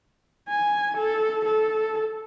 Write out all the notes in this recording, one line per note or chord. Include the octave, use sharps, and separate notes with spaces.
G#5
A4
A4